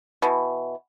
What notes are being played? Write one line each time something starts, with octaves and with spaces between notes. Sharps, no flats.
B2 E3